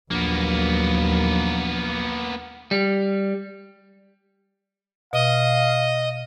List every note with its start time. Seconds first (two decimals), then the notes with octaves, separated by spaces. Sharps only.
0.11 A#1 D#2 F#3 A#3 B3
2.71 G3
5.13 B2 D#5 F5